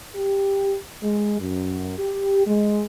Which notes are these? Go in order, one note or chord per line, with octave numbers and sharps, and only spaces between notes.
G4
G#3
F#2
G4
G#3